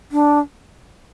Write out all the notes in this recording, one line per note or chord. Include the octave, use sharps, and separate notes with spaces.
D4